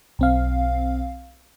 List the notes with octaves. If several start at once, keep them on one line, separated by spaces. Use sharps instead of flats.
B1 C4 F5